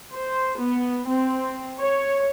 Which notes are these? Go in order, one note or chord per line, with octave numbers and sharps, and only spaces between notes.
C5
B3
C4
C#5